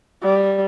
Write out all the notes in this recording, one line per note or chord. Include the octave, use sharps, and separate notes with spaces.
G3